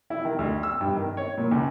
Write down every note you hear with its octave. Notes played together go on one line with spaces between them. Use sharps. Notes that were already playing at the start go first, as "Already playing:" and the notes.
E4
D#3
D2
E6
G2
D#3
C#5
A#2
C#2